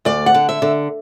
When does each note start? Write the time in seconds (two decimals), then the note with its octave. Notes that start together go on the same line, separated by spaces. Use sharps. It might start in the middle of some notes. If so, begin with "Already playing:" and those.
0.05 D2 D5
0.26 F#5
0.34 D3
0.49 E5
0.62 D3